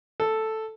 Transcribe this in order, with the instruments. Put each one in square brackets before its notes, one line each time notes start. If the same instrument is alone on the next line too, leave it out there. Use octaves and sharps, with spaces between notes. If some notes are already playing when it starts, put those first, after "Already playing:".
[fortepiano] A4